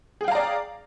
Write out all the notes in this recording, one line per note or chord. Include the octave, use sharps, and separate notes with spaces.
G#4 D5 F5 G5 A#5